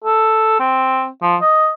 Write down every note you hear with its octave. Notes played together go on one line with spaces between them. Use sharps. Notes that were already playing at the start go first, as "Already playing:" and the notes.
A4
C4
F3
D#5